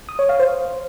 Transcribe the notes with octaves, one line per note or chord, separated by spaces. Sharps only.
D#6
C#5
F5
C5